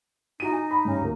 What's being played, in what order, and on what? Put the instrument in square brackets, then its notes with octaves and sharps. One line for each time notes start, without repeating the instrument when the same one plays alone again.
[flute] D#4 [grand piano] E4 F#4 D#7
[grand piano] G#5
B5
G2 G3 C#4
D2 A#3